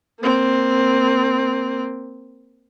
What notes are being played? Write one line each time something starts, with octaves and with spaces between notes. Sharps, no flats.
A#3 C4